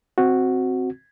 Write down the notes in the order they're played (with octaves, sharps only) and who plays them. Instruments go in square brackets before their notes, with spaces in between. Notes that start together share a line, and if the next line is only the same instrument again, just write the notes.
[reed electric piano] C4 F#4